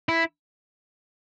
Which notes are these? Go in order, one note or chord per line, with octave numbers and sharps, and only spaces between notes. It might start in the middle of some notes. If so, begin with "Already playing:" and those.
E4